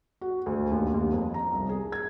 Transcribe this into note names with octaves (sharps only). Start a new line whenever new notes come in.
F#4
D2
D#2
D#2
F2
A#5
C2
G#4
G#6